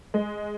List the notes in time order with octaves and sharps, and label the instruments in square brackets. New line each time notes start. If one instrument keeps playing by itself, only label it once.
[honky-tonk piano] G#3